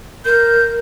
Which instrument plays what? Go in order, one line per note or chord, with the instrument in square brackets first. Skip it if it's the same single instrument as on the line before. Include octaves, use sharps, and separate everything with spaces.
[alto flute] A#4 [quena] G6